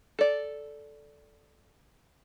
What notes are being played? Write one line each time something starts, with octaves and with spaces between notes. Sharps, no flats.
A4 D5